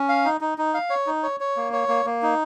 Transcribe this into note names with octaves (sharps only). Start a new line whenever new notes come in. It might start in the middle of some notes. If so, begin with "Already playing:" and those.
Already playing: C#4
F5
D#4
D#4
D#4
F5
C#5
D#4
C#5
C#5
A#3
C#5
A#3
A#3
D#4